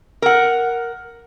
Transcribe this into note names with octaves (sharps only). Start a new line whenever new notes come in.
A#4 F#5